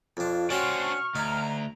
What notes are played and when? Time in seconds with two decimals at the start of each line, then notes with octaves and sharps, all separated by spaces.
0.17 F2 D4 F4
0.50 C#4 D4 F#4 C5 G5 C#6 F6
1.16 D2 D#4 A#5